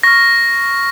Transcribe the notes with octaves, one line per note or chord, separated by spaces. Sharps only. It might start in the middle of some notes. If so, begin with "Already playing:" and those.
C#6 F6 A#6